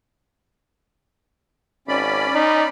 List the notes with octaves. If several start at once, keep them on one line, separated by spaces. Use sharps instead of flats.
G#1 C#4 D5 B5
D#4